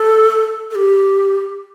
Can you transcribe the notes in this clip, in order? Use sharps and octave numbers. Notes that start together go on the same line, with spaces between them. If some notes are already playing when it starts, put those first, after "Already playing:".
Already playing: A4
A4
G4